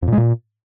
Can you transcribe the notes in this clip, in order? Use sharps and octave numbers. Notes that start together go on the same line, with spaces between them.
F2
A#2
G#3
A#2